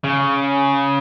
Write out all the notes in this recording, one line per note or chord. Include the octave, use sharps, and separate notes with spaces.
C#3